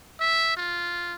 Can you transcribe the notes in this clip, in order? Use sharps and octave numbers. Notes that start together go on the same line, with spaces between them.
E5
F4